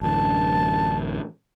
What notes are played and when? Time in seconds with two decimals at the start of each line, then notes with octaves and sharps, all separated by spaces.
0.01 A1 F#2 D3 A5